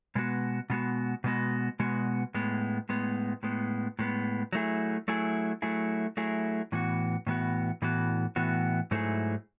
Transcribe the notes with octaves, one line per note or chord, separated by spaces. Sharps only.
B2 G#3 B3 F#4
B2 G#3 B3 F#4
B2 G#3 B3 F#4
B2 G#3 B3 F#4
A2 G#3 B3
A2 G#3 B3
A2 G#3 B3
A2 G#3 B3
F#3 A3 E4 G#4
F#3 A3 E4 G#4
F#3 A3 E4 G#4
F#3 A3 E4 G#4
A2 E3 B3 F#4
A2 E3 B3 F#4
A2 E3 B3 F#4
A2 E3 B3 F#4
G#2 F#3 A3 E4 G#4